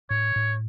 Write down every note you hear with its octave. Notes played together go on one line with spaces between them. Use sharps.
A2 C#5
A2